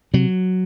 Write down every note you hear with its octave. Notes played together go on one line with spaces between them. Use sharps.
C3 F#3